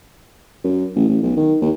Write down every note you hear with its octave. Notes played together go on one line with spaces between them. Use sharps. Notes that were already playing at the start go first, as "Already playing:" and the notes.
F#2
A1
A1
B1
D#3
D#2